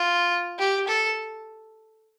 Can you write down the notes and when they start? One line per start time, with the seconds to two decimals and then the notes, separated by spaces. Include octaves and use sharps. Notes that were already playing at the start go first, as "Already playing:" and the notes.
Already playing: F4
0.59 G4
0.88 A4